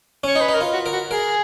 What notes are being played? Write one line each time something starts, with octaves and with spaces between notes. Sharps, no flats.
C#4 C#5
D#4
B4
D#4
A#4
F4
F#4
A#4
F#4
G#4 A#4